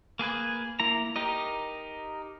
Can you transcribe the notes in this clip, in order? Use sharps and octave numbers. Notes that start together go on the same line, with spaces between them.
A#3 G#4 B4 G#5
A#3 E4 A#5
D#4 G4 A#4 D#5